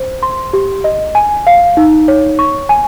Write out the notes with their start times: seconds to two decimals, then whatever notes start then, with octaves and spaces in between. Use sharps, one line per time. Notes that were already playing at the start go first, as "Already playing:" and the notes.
Already playing: C5
0.23 C6
0.53 G4
0.84 D#5
1.15 G#5
1.47 F5
1.77 D#4
2.08 C#5
2.39 C#6
2.69 G#5